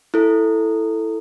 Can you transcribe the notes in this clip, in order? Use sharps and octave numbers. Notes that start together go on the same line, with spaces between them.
E4 A4